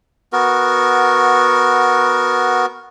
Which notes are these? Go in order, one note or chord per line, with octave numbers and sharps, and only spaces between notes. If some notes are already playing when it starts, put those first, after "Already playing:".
B3 F#4 A#4